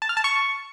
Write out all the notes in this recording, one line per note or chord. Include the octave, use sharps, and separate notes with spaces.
A5
F6
A5
C#6